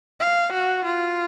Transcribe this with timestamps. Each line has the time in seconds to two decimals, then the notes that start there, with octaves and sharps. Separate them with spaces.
0.20 F5
0.52 F#4
0.85 F4